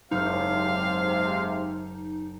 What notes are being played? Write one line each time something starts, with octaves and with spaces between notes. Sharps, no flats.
F#1 G#2 C3 D#4 F5 F6